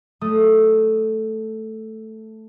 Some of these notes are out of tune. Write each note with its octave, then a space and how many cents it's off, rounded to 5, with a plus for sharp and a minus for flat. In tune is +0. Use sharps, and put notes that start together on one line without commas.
A3 +0 D#6 +0